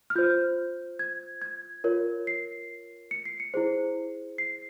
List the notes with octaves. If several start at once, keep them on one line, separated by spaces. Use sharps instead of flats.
F6
F4 C5 G6
G#6
G#6
F4 A#4 C#5
C7
C#7
C7
C#7
E4 G#4 C5
C7